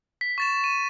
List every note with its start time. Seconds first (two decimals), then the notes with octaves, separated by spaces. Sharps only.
0.21 B6
0.38 C#6 A6 E7
0.64 D#7